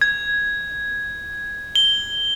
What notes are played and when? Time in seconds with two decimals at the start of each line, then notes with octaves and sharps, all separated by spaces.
0.01 G#6
1.75 G7